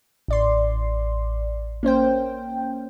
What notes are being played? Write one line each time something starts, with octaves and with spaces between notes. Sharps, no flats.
A1 D5 C6
A#3 C#4 C5 G5